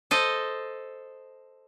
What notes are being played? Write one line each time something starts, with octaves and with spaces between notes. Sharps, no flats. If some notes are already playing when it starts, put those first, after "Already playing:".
A4 C5 D#5